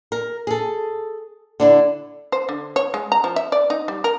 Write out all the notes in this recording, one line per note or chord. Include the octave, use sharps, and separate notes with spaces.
A#4
G#4 A4
D3 D4 E4
C5
D3
C#5
G#3
A#5
F3
E5
D5
D#4
G3
A#4